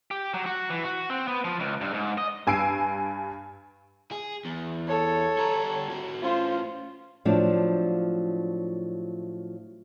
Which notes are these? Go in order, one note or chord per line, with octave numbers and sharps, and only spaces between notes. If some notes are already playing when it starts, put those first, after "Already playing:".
G4
F#3
F#4
E3
F#4
C4
B3
F3
C#2
G2
G#2
D#5
G2 G#5 E6 C7 D7
G#4
E2
A4 C#5
G3 A#5
C4 F#4
A2 C#4 F4 C5
A2 F3 F#3 D4